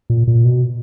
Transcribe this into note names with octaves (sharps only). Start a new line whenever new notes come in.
A#2
A#2
B2